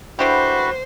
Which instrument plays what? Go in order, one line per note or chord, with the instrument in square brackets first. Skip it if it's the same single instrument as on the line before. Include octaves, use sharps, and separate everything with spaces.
[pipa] D3 E4 G4 [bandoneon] F#4 B4 [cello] C5